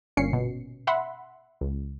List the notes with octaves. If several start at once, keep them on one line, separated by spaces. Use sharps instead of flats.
G1 A#2 C#4 C7 C#7
B2
E5 F#5 B5 C6
C#2